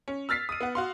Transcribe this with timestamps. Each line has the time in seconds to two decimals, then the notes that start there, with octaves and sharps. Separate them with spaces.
0.08 C#4
0.29 E6 F6 A6 B6 C7
0.49 D#6 D#7
0.61 B3 F#5
0.75 F#4 F5 C6